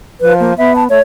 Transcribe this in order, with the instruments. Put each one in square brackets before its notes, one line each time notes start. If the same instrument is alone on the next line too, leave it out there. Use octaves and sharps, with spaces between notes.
[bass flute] F3 [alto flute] B4
[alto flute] A#3
[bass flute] B3 [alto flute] E5
[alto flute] A5
[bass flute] A3 [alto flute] C#5